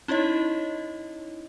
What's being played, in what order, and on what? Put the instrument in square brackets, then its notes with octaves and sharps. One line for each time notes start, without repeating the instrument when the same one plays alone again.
[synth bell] C#4 D#4 E4 C#5 D#5